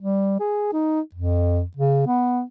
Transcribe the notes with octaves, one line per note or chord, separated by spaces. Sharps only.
G3
G#4
D#4
F2
C#3
B3